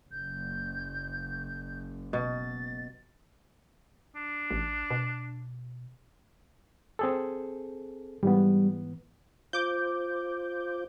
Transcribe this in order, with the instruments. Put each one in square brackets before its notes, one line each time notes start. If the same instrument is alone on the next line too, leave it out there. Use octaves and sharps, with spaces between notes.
[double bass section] F#1 [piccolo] G6
[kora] B2 [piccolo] A6
[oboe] D4
[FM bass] A1
B2
[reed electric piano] C4 G#4 A4
[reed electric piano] G#2 E3 B3 [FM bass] G3
[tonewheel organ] F4 C5 [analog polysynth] D6 G6